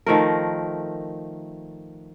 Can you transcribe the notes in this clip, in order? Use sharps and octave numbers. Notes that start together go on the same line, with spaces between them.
D#3 F3 A3 A#4